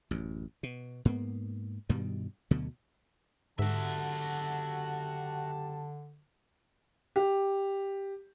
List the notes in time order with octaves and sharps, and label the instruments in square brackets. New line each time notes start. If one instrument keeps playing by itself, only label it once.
[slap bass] A1 F#2
B2
G#2 A#3 B3
G2 B2 D#3 G3
D2 B2 D3 F#3
[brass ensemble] F#1 G4 A5 [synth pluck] G#2 [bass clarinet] D3 [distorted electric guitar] F#4 E5
[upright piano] G4